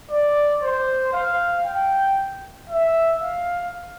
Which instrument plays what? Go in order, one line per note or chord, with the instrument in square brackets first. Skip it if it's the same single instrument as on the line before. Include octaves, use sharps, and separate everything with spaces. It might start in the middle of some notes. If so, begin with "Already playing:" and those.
[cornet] D5
C5
F5
G5
E5
F5